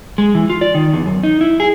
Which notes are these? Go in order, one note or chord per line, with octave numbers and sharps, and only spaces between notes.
G#3
E3
F4
D5
D#3
E2
F#2
D#4
E4
G#4